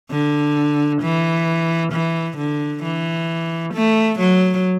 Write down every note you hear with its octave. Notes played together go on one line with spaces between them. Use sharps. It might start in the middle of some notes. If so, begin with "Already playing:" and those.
D3
E3
E3
D3
E3
A3
F#3